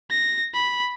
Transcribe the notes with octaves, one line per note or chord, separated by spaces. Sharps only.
A#6
B5